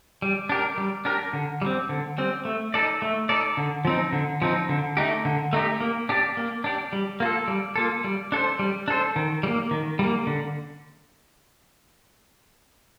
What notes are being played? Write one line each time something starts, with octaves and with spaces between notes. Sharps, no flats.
G3
D4 G4 A#4
G3
D4 G4 A#4
D3
G3 C4
D3
G3 C4
A3
D#4 A4 D5
A3
D#4 A4 D5
D3
F3 C4 D#4
D3
F3 C4 D#4
D3
A3 D#4 G4
D3
A3 D#4 G4
A#3
D4 G4 D5
A#3
D4 G4 D5
G3
A#3 F4 A4
G3
A#3 F4 A4
G3
D4 A4 C5
G3
D4 A4 C5
D#3
G3
A#3
D#3
G3 A#3
D3